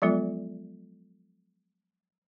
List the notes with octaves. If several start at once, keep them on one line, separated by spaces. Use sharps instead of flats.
F3 F#3 G#3 B3 F4 A4